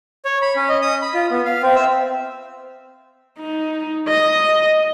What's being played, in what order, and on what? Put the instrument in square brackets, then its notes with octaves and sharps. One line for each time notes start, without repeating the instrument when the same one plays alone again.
[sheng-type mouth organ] C#5
B5
C#4
D#5
D#6
B5
F4
B3
F5
C4
E5
[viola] D#4
D#5